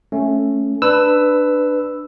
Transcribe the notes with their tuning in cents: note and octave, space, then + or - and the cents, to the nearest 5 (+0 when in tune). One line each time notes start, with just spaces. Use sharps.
A3 +0 C#4 -5
D4 +15 B4 +10 E6 +0